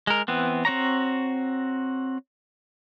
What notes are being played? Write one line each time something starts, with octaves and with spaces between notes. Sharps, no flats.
G#3 A#4
E3 B3 C4
C4 F#4 C#5 A#5